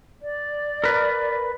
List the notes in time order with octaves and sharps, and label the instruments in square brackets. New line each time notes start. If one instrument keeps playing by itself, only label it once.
[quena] D5
[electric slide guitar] A#4 B4